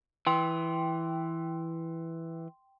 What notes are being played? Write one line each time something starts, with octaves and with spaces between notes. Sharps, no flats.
E3 G5 C6